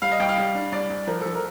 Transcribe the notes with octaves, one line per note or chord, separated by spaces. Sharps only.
G3 F5
D#5
C2 G5
F5
G3
D4
C2 D5
C2
F3 A#4
F3 A4
A#4